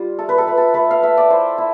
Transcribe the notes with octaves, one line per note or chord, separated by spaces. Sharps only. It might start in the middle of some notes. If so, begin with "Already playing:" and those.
Already playing: G3 F4
A3 A4
B4
A4
A3 B4
A4
A3 B4
F5
A3 E5
D5
E4 C5
E4